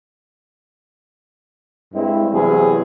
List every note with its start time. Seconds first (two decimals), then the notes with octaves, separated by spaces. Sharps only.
1.94 G2 G#3 C4 E4
2.33 E2 C3 F#3 E4 G#4